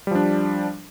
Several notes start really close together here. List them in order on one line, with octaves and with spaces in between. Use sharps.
G3 F3 D4